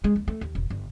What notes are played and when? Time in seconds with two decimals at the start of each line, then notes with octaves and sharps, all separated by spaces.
0.04 G#3
0.16 D#2
0.28 A3
0.41 D#2
0.55 E1
0.70 G1